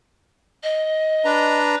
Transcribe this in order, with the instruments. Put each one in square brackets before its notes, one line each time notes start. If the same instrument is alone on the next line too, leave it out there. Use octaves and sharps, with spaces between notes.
[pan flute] D#5
[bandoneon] D4 B4 A#5